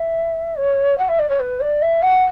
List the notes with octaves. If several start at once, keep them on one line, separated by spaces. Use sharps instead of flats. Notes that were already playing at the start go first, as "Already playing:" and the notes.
Already playing: E5
C#5
F#5
E5
D5
C#5
B4
D5
E5
F#5